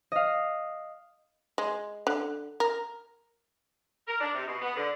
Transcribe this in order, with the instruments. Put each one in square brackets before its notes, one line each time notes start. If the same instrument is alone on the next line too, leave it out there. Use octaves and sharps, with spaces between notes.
[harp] D#5 F5
[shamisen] G#3
D3
A#4
[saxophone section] A#4
D4
C3
B2
B3
D3